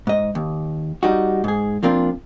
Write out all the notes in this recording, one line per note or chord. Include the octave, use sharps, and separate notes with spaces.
G#2 D#5
D#2
G3 D#4 F#4
G#2 G#4
F3 A#3 C4 D4 F4